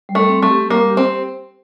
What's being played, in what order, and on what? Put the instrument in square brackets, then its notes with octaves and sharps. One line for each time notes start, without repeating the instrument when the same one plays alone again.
[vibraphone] G3
[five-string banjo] A3
[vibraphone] C4
[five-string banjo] A3
[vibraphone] G4
[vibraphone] G3 [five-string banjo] A#3
[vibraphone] G4
[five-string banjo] C4